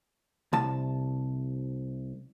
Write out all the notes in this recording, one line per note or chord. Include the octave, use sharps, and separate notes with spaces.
C2 A5